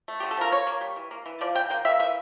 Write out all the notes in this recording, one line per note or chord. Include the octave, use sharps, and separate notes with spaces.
A3
D3 G4
A4
F3 A#4
A#3 C#5
A#3
G3
E3
A#3
E3
F3 D5
C#3 G5
A#3 G5
A#3 E5
E3 E5